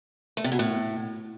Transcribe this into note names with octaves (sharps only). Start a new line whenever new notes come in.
A3
C3
B2
A2